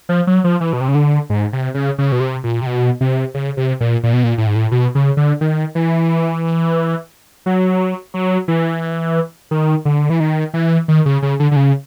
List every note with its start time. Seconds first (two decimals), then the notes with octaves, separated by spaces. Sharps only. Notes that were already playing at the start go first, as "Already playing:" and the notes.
0.09 F3
0.27 F#3
0.44 F3
0.61 E3
0.73 B2
0.81 C3
0.88 C#3
0.95 D3
1.30 G#2
1.53 C3
1.74 C#3
1.98 C#3
2.12 B2
2.20 C3
2.44 A#2
2.61 C3
2.66 B2
3.01 C3
3.34 C#3
3.57 C3
3.80 A#2
4.03 A#2
4.13 B2
4.24 A#2
4.38 A2
4.47 G#2
4.55 A2
4.71 B2
4.95 C#3
5.17 D3
5.41 D#3
5.75 E3
7.46 F#3
8.14 F#3
8.48 E3
9.51 D#3
9.85 D3
10.10 E3
10.20 D#3
10.54 E3
10.88 D#3
11.06 C#3
11.22 C#3
11.40 D3
11.51 D3
11.56 C#3